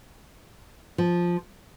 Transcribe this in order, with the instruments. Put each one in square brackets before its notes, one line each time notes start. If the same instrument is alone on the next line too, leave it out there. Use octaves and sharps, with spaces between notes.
[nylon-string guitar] F3